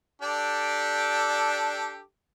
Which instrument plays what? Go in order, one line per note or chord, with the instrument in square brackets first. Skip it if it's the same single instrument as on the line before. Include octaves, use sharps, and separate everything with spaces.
[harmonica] D4 G4 A4